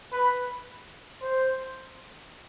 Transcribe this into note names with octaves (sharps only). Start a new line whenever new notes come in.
B4
C5